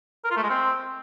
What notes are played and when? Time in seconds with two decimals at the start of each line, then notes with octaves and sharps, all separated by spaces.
0.24 A#4
0.31 F4
0.37 A3
0.43 G#3
0.49 C4